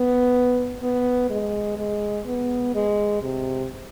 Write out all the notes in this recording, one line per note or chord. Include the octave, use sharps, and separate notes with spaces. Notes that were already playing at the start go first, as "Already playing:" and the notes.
Already playing: B3
B3
G#3
G#3
B3
G#3
C3